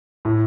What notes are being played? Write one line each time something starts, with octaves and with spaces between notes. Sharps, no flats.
A2